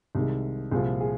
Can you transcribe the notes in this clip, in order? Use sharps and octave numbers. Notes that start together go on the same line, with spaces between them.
C2 C3 D#3 G#3
C2 A#2 F3 G#4
G#4